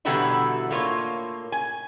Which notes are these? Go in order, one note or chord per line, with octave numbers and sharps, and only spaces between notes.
B2 D3 E3 F#3 G3 E4
A2 A#3 F4 C#5
G#5